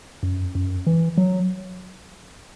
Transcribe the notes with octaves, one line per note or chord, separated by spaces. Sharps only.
F#2
F#2
E3
F#3